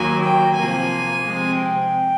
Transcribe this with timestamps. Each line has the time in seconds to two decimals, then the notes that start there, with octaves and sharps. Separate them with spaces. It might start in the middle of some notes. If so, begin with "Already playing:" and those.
Already playing: D#2 D#3 F#3 A#3 G#5
0.24 G5
0.57 C3 F3 A#3 G#5
1.24 C3 F3 G#3 C4
1.56 G5